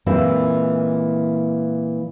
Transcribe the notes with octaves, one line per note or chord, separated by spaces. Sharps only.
A#2 E3 G#3 C4 E4